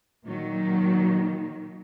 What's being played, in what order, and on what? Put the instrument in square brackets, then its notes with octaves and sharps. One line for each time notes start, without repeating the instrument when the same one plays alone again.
[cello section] A#2 D#3 F#3